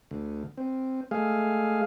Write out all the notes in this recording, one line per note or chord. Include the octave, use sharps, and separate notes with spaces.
D2
C4
G#3 A3 G#4 F5